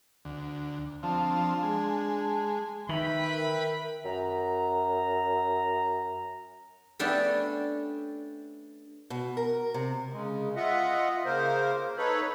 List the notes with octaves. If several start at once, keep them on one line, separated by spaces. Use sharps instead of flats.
D2
F3 C4 D4
G#3
D#3 B4 E5 G5 B5
A#4
F#2 A#5
A3 B3 C#4 D4 G4 A4
B2
A#4
C3
C#3 G#3
F4 D#5 E5 F#5
C#3 A#3 A#4 C5
D#4 A4 B4 C#5 B5